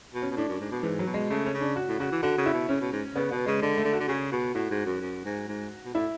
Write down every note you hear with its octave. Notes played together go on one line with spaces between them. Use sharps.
B2
C#4
B2
A2 D4
F#2
G#2
B2
G#2 E3
F#3
B2
G#3
C#3 A3
C#4
C#3
D4
F#4
A2
C#3 F#4
E3
D3 F#4
C#3
E4
B2
C#3 C#4
B2
G#2
C#3 B3
B2 B3
C#3 G#3
D3 G#3
A3
D3
F#4
D3
C#3 G#4
B2 F#4
A2 F#4
G#2
F#2
F#2
G#2
G#2
B2
A2 E4